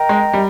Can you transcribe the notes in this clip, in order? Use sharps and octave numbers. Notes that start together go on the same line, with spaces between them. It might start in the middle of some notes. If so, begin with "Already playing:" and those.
Already playing: A#4 D#5 G5 A#5
G#3
G3